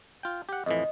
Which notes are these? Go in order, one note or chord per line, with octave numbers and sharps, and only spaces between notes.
F4 G5
G4 F#5
F2 A2 E3 D#5